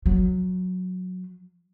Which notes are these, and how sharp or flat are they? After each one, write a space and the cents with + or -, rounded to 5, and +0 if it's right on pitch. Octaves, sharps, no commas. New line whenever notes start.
F#3 -10